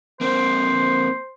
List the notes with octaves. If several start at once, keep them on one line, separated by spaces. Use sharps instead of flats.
A#3 C4 C5